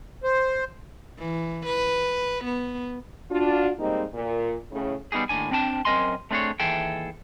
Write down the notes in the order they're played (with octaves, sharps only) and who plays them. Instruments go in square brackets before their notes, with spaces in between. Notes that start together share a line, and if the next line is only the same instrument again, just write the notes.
[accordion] C5
[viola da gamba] E3
B4
B3
[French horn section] D4 F4 F#4
G3 G#3 A#3 C4 D#4
A#2
A2 C#3
[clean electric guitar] G3 B3 D#4 G4 G#4
D#2 A2 E3 D4 G#5
C4 D4 G5 A5
F#2 C4 A#4 D#5 G#5 C6
A3 C4 D4 G4 G#4 C#5
D#2 E3 G#4 A4 E5 G5